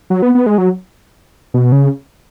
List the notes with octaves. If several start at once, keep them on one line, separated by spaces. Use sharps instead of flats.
F#3
B3
B3
G#3
F#3
B2
C#3